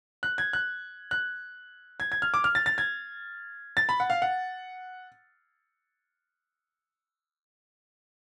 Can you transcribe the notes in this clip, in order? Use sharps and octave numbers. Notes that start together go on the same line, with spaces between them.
F#6
G#6
F#6
F#6
G#6
G#6
F6
D6
F6
A6
A6
G#6
A6
B5
F#5
F5
F#5